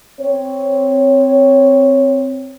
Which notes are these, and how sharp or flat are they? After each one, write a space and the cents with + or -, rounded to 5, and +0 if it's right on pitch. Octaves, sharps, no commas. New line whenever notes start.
C4 +0 C#5 +0